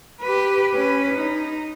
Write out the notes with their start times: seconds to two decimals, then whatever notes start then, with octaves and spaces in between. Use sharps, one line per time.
0.21 G4 B4
0.74 C#4 B4
1.14 D#4